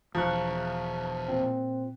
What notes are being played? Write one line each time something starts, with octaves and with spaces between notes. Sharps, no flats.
E1 E2 F3 F5 A#5 C#6 F#6
A#2 C4